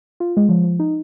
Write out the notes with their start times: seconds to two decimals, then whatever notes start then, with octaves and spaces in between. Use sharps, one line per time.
0.20 F4
0.37 G#3
0.49 F3
0.64 F3
0.79 D#4